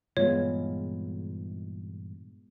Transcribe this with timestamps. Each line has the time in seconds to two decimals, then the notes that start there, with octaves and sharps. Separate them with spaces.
0.17 G2 A#2 E3 G#3 B3 F4 C#5